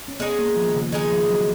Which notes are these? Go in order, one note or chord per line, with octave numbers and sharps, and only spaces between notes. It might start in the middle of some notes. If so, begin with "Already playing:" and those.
C#4
G#3 B3 D#4 G#4
A#3
F3
D#3
C#3
D#3 G#3 D#4 G#4
F3
F#3